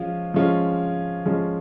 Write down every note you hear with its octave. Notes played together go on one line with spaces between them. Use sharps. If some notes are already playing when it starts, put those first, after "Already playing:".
Already playing: F3 G#3 C#4 F4
F3 G#3 C#4 F4
F3 G#3 C#4 F4